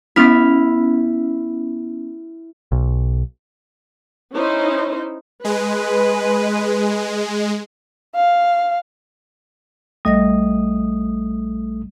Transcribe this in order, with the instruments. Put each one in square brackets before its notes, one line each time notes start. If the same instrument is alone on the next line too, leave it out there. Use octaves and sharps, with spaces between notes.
[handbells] B3 C#4 B6 [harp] E4 F6
[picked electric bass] B1
[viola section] C#4 D#4 E4 C5
[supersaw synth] G#3 [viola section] B4
[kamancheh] F5
[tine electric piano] A#1 A3 D#6 [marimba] G3 D#5 A#6